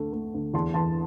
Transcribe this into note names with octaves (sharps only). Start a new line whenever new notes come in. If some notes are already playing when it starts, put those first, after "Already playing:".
Already playing: D2 A3
A3
D2
E2 A5 C6
E3 A5 C6